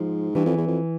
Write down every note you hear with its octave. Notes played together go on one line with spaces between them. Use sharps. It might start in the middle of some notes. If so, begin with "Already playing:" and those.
Already playing: G#2 F3
G2 E3
F2
E2
F2